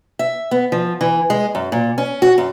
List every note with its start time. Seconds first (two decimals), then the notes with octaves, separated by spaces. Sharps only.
0.19 E5
0.51 B3
0.72 F3
1.01 E3
1.30 G#3
1.55 F#2
1.72 A#2
1.98 C#4
2.22 F#4
2.38 F#2